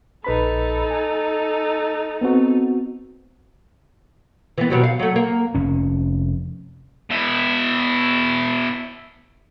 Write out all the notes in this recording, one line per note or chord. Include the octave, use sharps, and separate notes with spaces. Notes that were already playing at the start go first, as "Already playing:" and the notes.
A#1 D#4 A4 B4 B5
G#5
B3 C4 F#4
E3 B3
B2 F#3 G3
F5
F#3 A3
A#3
F1 C#4
B2 E4